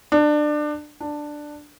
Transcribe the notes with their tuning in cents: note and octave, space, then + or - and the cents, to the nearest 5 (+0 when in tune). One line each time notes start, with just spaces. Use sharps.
D4 +25
D4 +10